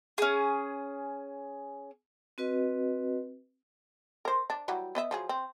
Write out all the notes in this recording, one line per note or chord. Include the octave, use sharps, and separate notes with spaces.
C#4 G#4
C4 F#4 B4 D#5
A#4 C5
D4
E3 F#3 G3
B3 D#5 E5
F3 F#3 G#4
C4